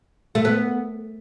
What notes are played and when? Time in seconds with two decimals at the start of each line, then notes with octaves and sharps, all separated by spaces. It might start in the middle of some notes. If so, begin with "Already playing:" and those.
0.35 A3
0.45 B3